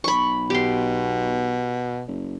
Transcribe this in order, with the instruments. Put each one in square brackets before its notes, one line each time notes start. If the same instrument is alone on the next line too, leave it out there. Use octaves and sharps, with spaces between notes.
[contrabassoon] B1 [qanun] B5 C#6
[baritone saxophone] B2 [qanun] G4 C6
[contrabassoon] F#1